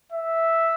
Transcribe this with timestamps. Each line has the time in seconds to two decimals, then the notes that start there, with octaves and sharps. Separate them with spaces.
0.12 E5